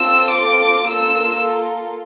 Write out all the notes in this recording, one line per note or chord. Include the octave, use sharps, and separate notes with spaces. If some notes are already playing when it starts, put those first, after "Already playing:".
Already playing: C4 F4 A4 E6
D6
A#3 F4 A4 E6